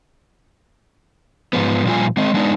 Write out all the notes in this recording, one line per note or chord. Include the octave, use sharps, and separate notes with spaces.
G#2 F3 B3
A#2 F3 G3 F4 G#5
G#3 C4 D#5
G#3 B3 D4 D#4